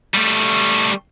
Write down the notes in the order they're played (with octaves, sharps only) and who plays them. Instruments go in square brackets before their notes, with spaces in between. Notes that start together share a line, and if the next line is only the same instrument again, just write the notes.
[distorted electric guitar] G3 A3